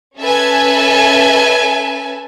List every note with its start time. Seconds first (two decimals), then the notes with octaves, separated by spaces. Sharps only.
0.18 C#4 A4 B4 E5 G#5 A5